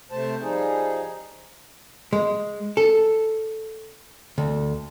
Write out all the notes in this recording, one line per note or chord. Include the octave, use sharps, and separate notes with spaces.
C3 A3 C5 A5
F3 G3 D#4 G#4
G#3
A4
D2